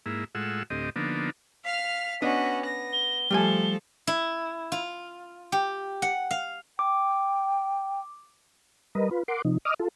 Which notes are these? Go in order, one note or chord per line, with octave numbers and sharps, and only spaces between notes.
G#2 A#3 E4
A2 G#3 F4 F#5 E6
D2 A2 C4 G4 D#5
D3 F3 A#3 B3 D4 D#4
F5 F6 B6
B3 C#4 D4 F#4 D#5
A#6
G7
F3 G3 A3 A4 G#5
E4
F4
G4
F#5
F5
G5 D6
G3 A#4 B4 D#5
F4 B4
A#4 F#5 C6 D6
C3 F3 D#4
D#5 D6 D#6 F6
F4 A4